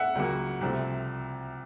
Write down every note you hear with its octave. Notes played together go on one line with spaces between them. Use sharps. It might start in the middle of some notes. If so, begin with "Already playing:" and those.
Already playing: E5 F#5
C#2 C#3 F#3 A#3
C2 C3 F3 A3